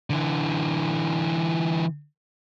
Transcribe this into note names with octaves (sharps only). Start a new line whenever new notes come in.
D3 E3